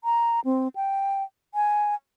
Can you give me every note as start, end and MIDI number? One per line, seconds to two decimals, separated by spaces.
0.04 0.40 82
0.45 0.68 60
0.76 1.23 79
1.55 1.95 80